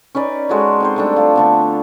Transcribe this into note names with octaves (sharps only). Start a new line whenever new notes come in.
C#4 D#4 B4 D5
G#3 F#4 A4 C#5
C4 D#4 C5
G3 A3 D4
F3 F4
D3 A3 B3